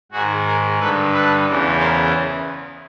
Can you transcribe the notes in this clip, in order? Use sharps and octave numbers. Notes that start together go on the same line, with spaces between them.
G#2 D#3 F#4 G#4
G#4 A#4
G2 D3 A4 B4
A4 B4
E2 C#3 E3
A#4 C5